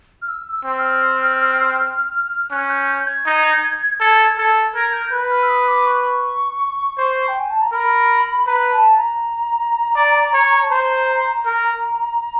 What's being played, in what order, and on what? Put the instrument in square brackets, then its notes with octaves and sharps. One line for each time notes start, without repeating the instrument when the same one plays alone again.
[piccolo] F6
E6
E6
[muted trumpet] C4
[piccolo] F6
[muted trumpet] C#4 [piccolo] F#6
[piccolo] G6
G6
G6
G#6
[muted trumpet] D#4
A4
A4
[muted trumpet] A#4 [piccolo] G#6
[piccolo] G6
G6
[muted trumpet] B4 [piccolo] F#6
[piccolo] F6
E6
D#6
D6
C#6
C#6
[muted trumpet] C5
[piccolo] G5
G#5
A5
A#5
[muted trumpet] A#4 [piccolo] B5
[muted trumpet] B4 [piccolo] A#5
[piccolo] A5
A#5
[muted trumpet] D5
C#5
[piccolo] A5
[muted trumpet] C5 [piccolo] A#5
[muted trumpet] A#4